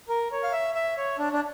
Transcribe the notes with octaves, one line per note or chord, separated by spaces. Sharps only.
A#4
C#5
F5
E5
E5
C#5
D4
D4